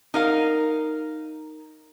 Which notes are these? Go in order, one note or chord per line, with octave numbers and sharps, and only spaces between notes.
D#4 A#4 F5